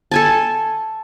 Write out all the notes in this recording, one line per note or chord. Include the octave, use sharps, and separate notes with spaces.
A4 G#5 A5